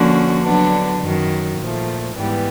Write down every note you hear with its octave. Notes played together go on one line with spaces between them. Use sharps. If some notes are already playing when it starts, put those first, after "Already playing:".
Already playing: D3 F3 A#3 C#4 F#4
D3 F#3 B3 D4
F#2 D#3 F#3
A#2 F3 A3
G#2 E3 G3 B3